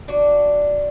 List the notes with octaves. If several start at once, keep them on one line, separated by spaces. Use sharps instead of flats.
D4 F#4